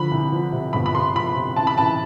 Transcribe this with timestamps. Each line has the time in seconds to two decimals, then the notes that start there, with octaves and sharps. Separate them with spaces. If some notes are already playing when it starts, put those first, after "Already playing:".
Already playing: D3 F3 B5
0.11 C2
0.32 F3
0.52 C3
0.73 G1 B5
0.86 B5
0.95 C3 C6
1.15 F2 B5
1.36 C3
1.56 A1 A5
1.67 B5
1.78 A1 A5